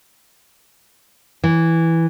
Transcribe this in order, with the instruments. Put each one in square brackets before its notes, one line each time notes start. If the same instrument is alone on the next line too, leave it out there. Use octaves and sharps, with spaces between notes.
[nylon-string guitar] E3